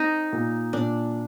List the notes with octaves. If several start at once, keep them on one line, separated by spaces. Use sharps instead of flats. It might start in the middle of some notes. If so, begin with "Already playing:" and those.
Already playing: C4 D#4
A#2
A#2 D4